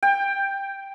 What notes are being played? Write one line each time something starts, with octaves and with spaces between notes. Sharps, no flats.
G5